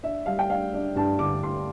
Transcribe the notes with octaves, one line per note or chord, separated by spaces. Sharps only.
D4 E5
G3 F5
G5
D4 F5
D4
G2 A5
D3 D6
G2 C6